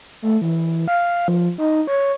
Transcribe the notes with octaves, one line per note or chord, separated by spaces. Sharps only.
A3
E3
F5
F3
D#4
C#5